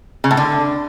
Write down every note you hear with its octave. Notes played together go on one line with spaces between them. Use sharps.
C#3
A2
D3